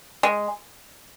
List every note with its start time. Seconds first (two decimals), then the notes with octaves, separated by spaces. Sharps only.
0.23 G#3